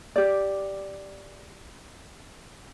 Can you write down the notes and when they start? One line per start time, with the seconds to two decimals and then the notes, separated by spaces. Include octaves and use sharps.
0.16 G4 D5